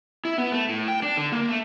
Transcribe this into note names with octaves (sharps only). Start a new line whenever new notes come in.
E4
B3
A3
A2
G5
D4
D3
A#3
A3